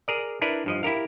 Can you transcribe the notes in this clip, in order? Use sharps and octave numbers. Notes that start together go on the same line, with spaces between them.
G#4 A#4 D5
D4 E4 A#4 B4 D5
G2 F3 D#5
E4 G4 A#4 F5